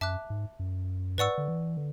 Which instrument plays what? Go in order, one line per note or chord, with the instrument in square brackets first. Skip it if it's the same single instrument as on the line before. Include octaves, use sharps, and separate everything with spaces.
[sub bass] F#2 [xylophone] E5 A5 D6 F#6
[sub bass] G#2
F#2
[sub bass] G#2 [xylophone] B4 D5 F#5 C#6 E6
[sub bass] D3
E3
D3